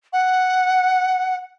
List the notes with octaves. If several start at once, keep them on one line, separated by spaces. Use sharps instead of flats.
F#5